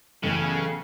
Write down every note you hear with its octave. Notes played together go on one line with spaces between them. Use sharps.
A1 F#2 C#3 B3 A4 G#5